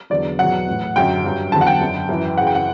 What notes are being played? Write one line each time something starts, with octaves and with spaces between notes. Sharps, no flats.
E2 D3 F#3 D5
E2 B2 F#3 F#5
A2 E3
F#2 D3 F#3 G5
G2 F#3
E2 D3 F#3 A5
F#5
G5
F#2 D3 F#3
F#2 E3
F#2 C#3 E3 F#5
G5
F#5